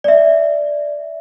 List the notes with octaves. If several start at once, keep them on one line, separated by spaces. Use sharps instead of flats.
D5 E5